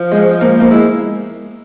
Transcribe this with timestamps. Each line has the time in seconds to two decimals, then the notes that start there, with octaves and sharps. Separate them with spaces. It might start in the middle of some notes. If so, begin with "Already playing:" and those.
Already playing: F3
0.11 G#3
0.41 A#3
0.60 A#3
0.70 G#3 E4